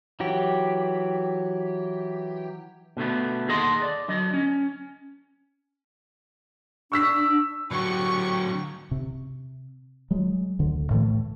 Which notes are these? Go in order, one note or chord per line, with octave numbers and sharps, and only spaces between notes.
E3 F#3 G4
B2 D3 A3 B3
D#2 G#4 A4 D#5 F#5 C6
D5
D3 F#3 D#5
C#4
D4 C#6 E6 B6
D3 F#3 G4 C#6
C3
F#3 G#3
D2 D3
A2 E3 A3